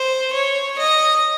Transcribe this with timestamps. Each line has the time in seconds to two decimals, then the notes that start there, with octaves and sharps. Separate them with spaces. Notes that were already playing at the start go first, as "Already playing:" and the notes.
Already playing: C5
0.33 C#5
0.78 D#5